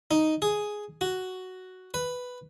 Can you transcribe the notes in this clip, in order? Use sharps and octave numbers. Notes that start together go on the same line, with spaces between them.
D#4
G#4
F#4
B4